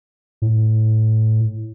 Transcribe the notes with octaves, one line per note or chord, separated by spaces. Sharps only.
A2